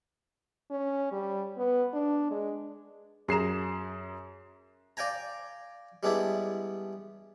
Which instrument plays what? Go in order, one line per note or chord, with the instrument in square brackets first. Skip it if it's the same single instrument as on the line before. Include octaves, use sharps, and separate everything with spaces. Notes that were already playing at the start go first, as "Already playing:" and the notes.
[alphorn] C#4
G3
B3
D4
G#3
[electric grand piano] F#2 C7 E7 [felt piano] G#4 A#5
[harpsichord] D5 F5 G5 G#5 A#5
G3 G#3 B3 D4 E4